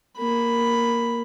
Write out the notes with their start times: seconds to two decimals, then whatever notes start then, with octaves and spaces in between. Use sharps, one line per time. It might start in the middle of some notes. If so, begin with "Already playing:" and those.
0.18 A#3 B5